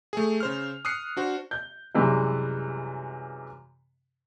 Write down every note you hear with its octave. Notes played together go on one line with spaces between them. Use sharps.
A3 G#4
C#3 C5 F6
D#6 F6 F#6 C7 C#7
D4 F#4 C5
G6
F#2 C3 E3 G3 G#3